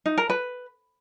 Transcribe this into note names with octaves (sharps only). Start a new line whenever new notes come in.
D#4
A#4
B4